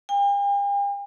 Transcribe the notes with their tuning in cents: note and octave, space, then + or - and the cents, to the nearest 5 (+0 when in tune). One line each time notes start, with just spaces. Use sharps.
G5 +45